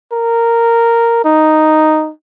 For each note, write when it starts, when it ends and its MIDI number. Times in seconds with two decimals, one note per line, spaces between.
0.13 1.21 70
1.25 2.11 63